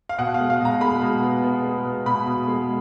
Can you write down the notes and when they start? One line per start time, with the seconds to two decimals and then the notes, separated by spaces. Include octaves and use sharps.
0.09 F5
0.18 B2 F#5
0.34 F5
0.40 G#3
0.50 F5
0.60 B2 A#5
0.81 G#3 B5
1.01 B2
1.23 B3
1.43 B3
1.64 G#3
1.85 B2
2.06 B2 B5
2.27 B2
2.47 G#3